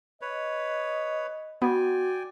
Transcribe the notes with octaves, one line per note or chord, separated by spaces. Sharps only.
B4 C#5 D#5
B3 F#4 D5 G5 G#5